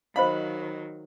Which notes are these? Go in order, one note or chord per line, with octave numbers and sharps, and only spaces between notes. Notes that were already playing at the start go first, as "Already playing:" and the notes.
D#3 F#3 C5 D#5 F5 B5